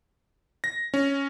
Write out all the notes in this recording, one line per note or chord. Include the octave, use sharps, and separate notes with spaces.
A#6
C#4